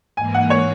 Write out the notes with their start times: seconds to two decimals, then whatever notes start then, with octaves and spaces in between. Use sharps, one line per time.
0.17 G#2 E3 A#3 G#5
0.34 F#5
0.50 C#5